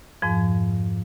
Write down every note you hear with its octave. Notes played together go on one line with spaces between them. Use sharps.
F2 G#2 F3